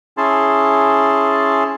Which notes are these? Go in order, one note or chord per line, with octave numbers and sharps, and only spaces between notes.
C#4 E4 G#4 A5 C6